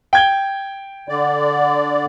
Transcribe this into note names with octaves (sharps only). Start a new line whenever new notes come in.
G5 G#6 G7
D3 D5